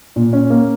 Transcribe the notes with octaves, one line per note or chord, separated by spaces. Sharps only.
A#2
C#4
A#3